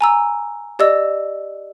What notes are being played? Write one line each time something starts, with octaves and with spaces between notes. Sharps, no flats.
G#5 A#5 E6
G4 D5 D#5 E6